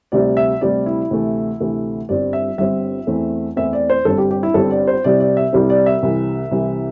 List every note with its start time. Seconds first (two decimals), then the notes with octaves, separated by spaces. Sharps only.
0.12 D2 C3 G3 C4 D5
0.37 E5
0.61 D2 C3 G3 C4 D5
0.86 E4
1.11 D2 C3 E3 A3
1.60 D2 C3 E3 A3
2.09 G1 G2 G3 C4 D5
2.33 E5
2.58 G1 G2 G3 C4 E5
3.07 E2 E3 A3 C4
3.56 E2 E3 A3 C4 E5
3.73 D5
3.90 C5
4.05 G1 G2 G3 C4 A4
4.18 G4
4.31 G4
4.43 E4
4.54 G1 G2 G3 C4 A4
4.71 D5
4.87 C5
5.04 C2 C3 G3 C4 D5
5.20 D5
5.37 E5
5.53 C2 C3 G3 C4
5.70 D5
5.86 E5
6.03 C2 C3 E3
6.51 C2 C3 E3